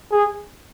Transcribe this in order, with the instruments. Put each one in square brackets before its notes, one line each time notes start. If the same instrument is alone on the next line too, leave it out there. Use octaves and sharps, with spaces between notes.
[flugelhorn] G#4